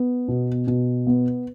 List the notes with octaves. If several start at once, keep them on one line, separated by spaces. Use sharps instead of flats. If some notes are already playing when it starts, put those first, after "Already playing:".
Already playing: B3
B2
B2
B3